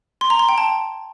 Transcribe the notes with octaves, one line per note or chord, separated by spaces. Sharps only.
C6
A#5
C6
G5
A5